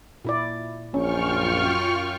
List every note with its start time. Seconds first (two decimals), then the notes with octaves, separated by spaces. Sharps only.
0.25 A#2 E4 D5
0.94 A#1 F#2 C#4 F4 G5 C#6 F6